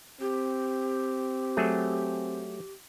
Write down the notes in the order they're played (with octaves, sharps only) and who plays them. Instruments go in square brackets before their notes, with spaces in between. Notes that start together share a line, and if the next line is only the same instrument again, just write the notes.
[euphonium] C4 [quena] G4
[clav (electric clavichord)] F#3 A3 G#4